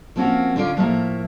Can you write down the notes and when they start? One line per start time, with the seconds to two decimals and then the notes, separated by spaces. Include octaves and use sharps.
0.16 F3 A#3 C4 C#4 F#4
0.56 D3 C#4 F4 D5
0.77 A2 F3 A#3 C#5 E5